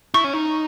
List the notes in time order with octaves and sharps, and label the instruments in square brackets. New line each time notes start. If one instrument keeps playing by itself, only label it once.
[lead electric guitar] E4 [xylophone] C#6
[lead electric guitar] C#4
D#4